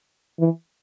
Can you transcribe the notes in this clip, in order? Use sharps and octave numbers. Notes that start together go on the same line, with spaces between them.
E3